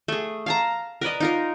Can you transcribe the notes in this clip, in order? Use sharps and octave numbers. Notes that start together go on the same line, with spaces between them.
A3 G#4
F5 A5 A#5
A#4 B4 D5 D#5
D#4 F4 A#4